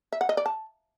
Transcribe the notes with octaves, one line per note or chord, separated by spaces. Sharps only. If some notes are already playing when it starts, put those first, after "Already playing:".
E5
F#5
D#5
D5
A5